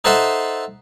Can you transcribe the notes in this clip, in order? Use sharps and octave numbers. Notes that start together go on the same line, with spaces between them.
D#4 A4 C5 E5 F#5 C6